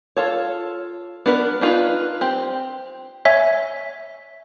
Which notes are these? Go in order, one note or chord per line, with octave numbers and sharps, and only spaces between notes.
F4 A4 C#5
B3 D4 A#4 B4
D4 D#4 F4 G#4 B4
C4 G4
C#5 E5 G#5